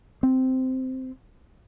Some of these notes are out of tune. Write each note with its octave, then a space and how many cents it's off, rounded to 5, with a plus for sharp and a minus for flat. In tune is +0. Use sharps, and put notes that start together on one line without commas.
C4 -10